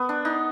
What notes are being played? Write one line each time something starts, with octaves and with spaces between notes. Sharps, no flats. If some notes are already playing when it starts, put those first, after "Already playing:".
Already playing: B3
D4
D#4